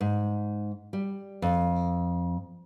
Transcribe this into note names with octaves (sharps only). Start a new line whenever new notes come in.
G#2
G3
F2